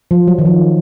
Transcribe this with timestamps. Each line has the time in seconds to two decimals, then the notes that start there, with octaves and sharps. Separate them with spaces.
0.11 F3
0.28 F#3
0.39 D#3
0.45 F3